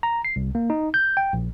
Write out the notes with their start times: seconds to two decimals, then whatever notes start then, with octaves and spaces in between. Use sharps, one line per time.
0.03 A#5
0.25 C7
0.36 C2
0.55 A#3
0.70 D#4
0.94 G6
1.17 G5
1.33 A#1